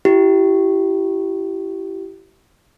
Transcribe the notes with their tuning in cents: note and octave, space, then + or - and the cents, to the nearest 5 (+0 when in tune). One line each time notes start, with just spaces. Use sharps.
E4 +25 G4 -25